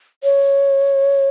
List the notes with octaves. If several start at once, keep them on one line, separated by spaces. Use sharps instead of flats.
C#5